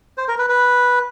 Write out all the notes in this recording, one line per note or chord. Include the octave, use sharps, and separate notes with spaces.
C5
A#4
B4
B4